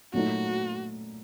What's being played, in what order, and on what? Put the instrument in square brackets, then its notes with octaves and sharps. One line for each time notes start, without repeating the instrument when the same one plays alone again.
[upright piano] A#2 F#3 A3 D#4 [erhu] F#4